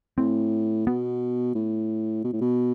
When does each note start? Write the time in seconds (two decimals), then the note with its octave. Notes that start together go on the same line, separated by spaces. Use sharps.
0.18 A2 C4
0.86 B2 B3
1.55 A2
2.24 B2
2.33 A2
2.41 B2